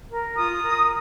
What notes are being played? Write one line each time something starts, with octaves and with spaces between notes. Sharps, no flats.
A#4
F4 D#6
A#4